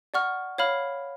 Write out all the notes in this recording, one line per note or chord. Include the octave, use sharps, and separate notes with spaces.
D5 F#5 C#6 F6
C#5 F5 B5 F6